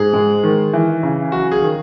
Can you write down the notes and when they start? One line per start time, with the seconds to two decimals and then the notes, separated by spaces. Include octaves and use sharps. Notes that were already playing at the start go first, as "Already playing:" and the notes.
Already playing: G#2 G#4
0.14 G#3
0.43 D#3
0.73 E3
1.03 C#3
1.32 F#3 F#4
1.52 G#4
1.62 D#3